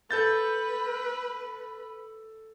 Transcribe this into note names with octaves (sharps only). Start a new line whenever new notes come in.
A4 B4 G6 A6